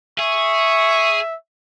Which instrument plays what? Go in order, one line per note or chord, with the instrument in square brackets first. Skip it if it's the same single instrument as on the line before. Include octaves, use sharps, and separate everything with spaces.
[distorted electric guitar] G#4 [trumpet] E5 [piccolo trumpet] C#6